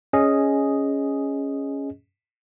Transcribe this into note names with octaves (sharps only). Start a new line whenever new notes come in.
C#4 G#4 D#5